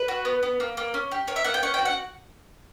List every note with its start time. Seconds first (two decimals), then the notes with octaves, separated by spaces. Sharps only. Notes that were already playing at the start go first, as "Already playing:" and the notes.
Already playing: B4
0.08 F#4
0.25 B3
0.43 B3
0.60 A#3
0.77 A#3
0.94 C#4
1.11 G4
1.27 A#3 C#5
1.36 E5
1.44 A#3 F#5
1.54 G5
1.63 C#4 F#5
1.74 G5
1.79 F#4
1.85 F#5